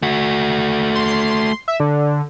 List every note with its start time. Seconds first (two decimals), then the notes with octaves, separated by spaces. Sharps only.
0.03 A3 F#4
0.95 C6
1.68 E5
1.80 D3